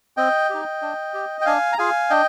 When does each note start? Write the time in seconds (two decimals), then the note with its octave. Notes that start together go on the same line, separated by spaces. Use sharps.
0.17 C4 D#5 G5
0.50 D#4 G4
0.82 D4
1.14 G4
1.41 G5
1.46 D4 F5 G#5
1.73 A#5
1.78 F4 G#4 F5 G#5
2.10 D4 D#5 G5